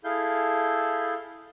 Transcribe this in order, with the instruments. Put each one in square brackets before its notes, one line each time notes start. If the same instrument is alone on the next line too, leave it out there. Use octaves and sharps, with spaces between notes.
[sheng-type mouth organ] E4 G#4 A4 F5 G6